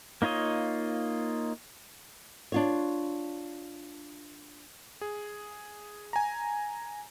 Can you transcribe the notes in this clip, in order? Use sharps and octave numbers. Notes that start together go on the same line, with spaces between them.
A#3 D#4 F4 C#5 D#5
D4 F4 C#5
G#4
G#5 A#5